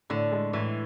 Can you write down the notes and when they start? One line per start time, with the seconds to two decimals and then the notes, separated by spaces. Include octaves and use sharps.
0.10 A2 D3
0.32 G#3
0.53 A2 E3